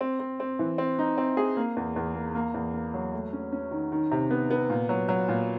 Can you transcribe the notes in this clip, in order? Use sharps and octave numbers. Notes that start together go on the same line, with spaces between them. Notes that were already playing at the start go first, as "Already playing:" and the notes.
C4
C4
C4
E3
C4
D#4
C4
G#4
A#3
E2
E2
A#3
A#3
E2
A#3
F#3
A3
C#4
C#4
D#3
D#3
C3
B3
B3
A#2
F#3
F#3
A#2